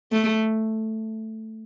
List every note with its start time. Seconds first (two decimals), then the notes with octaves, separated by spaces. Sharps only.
0.12 A3